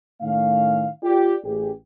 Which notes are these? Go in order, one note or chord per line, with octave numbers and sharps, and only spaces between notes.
A2 D#3 A3 C#4 F5
F4 G4 D5
A1 G4 G#4